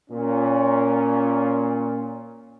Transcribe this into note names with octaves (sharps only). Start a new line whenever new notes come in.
A#2 C#4